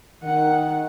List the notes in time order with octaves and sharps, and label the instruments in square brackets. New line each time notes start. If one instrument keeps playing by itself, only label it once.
[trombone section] D#3 [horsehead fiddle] F#5